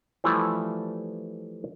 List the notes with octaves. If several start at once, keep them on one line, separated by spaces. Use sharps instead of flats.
E3 F3 G3 A3 E4